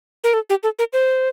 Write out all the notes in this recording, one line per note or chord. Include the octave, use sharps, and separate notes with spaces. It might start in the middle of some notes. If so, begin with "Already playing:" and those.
A#4
A4
G4
A4
A#4
C5